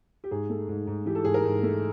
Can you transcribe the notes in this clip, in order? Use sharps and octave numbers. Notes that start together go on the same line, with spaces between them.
G4
G#2 G#4
A3
G#2
G#2
E3 G4
A4
G#2 G#4
A#4
G#2
A3